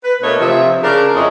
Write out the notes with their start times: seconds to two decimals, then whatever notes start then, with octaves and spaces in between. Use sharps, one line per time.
0.04 B4
0.21 B2 A3 A#3 D4 C#5 D#5
0.39 C3 F3 E5
0.82 C#3 D4 A#4
1.13 F2 G#3 C#4 D4 E4 D#5